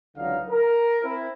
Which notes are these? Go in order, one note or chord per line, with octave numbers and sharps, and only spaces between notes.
C#2 D3 E3 F#3 D#4 F5
A#4
C4 E4